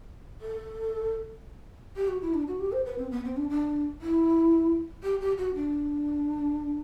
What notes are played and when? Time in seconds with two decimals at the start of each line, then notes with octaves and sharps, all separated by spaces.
0.41 A4
1.96 G4
2.08 F#4
2.22 E4
2.34 D4
2.48 F#4
2.60 G4
2.72 C5
2.85 B4
2.98 C4
3.11 B3
3.25 C4
3.37 D4
3.49 D4
4.01 E4
5.03 G4
5.21 G4
5.38 F#4
5.55 D4